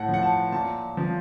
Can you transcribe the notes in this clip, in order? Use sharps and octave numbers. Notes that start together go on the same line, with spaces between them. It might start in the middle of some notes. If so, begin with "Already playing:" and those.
Already playing: A2 F#5 A5
F3
F#5
A5
A#2 A5
F3